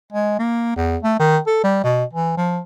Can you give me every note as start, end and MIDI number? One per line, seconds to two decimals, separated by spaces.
0.13 0.36 56
0.39 0.74 58
0.76 0.97 40
1.03 1.15 57
1.20 1.38 51
1.47 1.63 69
1.64 1.82 55
1.84 2.04 47
2.13 2.35 52
2.37 2.60 53